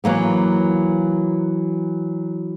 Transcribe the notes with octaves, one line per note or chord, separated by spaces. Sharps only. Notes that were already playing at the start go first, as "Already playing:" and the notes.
E3 F#3 A#3 B3